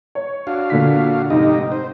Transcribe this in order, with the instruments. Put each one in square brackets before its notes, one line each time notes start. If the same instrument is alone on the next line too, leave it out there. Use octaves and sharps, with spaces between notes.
[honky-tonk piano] C#5
[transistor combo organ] D4 F#4 F5
[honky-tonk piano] A#2 D3 B6
[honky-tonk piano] F1 G#2 [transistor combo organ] D#4 G4 D#5
[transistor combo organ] C5